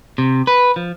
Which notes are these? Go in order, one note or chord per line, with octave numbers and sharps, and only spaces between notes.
C3
B4
F3